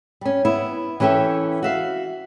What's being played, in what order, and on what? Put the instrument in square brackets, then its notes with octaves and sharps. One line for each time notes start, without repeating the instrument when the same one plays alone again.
[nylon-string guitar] G3 C#4
B3 E4
E3 C#4 G4 A4 E5
F#4 E5 F5